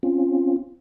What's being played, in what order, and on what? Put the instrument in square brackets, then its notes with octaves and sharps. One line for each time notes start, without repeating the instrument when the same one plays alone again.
[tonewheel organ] C4 C#4 F4